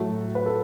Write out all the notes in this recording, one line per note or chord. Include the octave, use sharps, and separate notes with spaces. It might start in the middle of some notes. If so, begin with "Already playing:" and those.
Already playing: A2 F#3 A3 F#4 A4
B4
A4